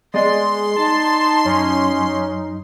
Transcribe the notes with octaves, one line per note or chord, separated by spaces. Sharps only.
G#3 B3 D5 D#5 C6
D#4 A5
F#2 C#4